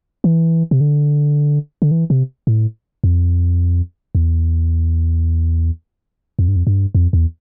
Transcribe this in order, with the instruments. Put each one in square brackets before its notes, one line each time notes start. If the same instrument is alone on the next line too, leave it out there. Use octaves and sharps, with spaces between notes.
[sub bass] E3
C3
D3
D3
E3
C3
A2
F2
E2
F2
G2
F2
G2
F2
E2